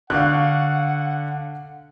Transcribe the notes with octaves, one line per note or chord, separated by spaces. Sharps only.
D3 F5 F#5 C#6 F#6